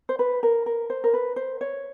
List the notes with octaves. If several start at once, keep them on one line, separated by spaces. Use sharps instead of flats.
C5
B4
A#4
A#4
C5
A#4
B4
C5
C#5